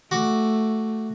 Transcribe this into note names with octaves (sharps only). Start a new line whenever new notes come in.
A3 F#4 D6